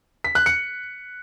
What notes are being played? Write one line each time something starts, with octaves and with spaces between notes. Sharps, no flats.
B6
F#6
C#7